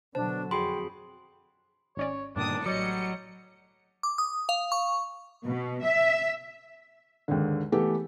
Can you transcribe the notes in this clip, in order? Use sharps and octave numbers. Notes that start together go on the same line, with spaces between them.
B2 D3 F#3 D4 C5 A5
F2 F#4 G#4 G5 B5 C6
G#1 C#4 C#5 D5
G2 A#2 D3 D#3 D4 D#6
A1 F#3 G3 D5 D#5 C#7
D6
D#6
F5
C#6
B2
E5
D#2 G#2 D3
E3 A3 B3 G4 A4